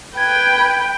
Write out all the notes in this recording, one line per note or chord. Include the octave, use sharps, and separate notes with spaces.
B4 G5 G#6